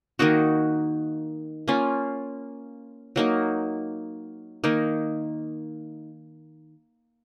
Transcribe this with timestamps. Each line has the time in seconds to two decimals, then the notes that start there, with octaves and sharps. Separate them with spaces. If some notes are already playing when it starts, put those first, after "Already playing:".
0.19 D#3 A#3 D#4 F#4
1.68 A#3 C#4 F4
3.16 F#3 A#3 D#4
4.64 D#3 A#3 D#4